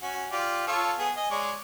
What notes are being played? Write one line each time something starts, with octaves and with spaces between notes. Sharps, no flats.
C#4 F#4
F4 G4 D5
F4 A4 C#5
B3 G#4
D#5 G#5
G#3 C#5 D5